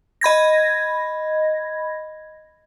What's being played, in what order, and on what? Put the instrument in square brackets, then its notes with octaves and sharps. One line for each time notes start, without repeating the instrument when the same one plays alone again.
[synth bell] D#5 B5 G#6 A#6